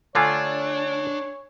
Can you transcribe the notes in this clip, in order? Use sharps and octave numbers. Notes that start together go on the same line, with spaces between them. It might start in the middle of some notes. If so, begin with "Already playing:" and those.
D3 A3 D4 F4 C#5 G#5 E6 G#6